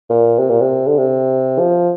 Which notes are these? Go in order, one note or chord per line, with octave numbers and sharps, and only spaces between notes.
A#2
C3
A#2
C3
D3
C3
F3